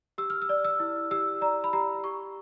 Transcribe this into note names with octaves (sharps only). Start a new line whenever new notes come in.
G4 E6
F6
E6
D5
E6
E4
G4 E6
D5 A#5
B5
G4 A#5
G4 C#6